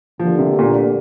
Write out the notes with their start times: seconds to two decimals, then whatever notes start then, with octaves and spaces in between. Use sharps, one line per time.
0.19 D2 D3 F3 A#3 G4
0.39 C3
0.59 A#2